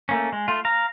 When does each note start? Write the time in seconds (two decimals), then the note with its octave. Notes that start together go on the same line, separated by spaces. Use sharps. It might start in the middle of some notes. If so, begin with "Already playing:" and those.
0.09 A3 A#3 C#4
0.33 G#3
0.48 A3 F4
0.65 F5 A#5